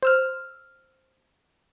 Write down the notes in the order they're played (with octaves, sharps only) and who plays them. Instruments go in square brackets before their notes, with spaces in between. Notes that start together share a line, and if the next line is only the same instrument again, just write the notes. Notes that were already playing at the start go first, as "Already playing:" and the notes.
[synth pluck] C5 E6 F6